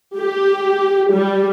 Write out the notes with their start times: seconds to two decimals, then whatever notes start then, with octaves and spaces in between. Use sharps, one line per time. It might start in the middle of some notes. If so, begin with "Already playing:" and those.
0.17 G4
1.12 G3